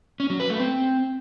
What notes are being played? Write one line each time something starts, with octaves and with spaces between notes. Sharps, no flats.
C#4
F#3
B4
A3
C4